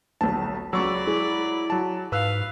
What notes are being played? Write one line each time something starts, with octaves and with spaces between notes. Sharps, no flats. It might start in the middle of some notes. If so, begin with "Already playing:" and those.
D#1 B1 A5
C#2 F#3 D5 B5 C#6 E6
G#3 E4
F#3 A5
G#2 B4 F5 E6 F#6